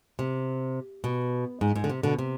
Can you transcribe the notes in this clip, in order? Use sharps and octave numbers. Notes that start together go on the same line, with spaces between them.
C3
B2
G#2
G#2
D3
C3
B2 D3
C3